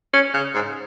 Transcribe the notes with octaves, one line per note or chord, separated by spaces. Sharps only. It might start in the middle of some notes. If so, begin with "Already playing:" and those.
C#4
C#3
G#2